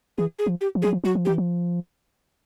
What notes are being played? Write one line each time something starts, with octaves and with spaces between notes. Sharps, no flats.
E3 G#4
G#4
F3
G4
F3
F#3 G#4
F3
F#3 F#4
F3
E3 G4
F3